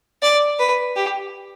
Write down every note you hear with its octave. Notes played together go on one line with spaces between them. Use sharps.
D5
B4
G4